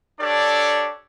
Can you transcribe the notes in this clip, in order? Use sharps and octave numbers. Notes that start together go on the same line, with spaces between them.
D4 G4 A4 C#5 D5